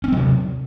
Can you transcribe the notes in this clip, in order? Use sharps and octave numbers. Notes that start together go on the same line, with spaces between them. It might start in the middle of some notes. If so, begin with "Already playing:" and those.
C3 F#3 C4 C#4